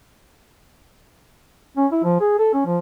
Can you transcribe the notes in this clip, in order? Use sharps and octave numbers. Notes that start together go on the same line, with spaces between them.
C#4
E4
F3
G#4
A4
C#4
F3